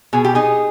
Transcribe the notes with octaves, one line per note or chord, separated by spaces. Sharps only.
B2 G#4
G4
D#4 G#4